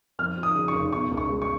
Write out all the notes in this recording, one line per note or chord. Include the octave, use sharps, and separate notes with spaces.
F2 F6
F3
D#6
C#3
C#6
F1
B2 C#6
C#2
C#6
G#3
C#6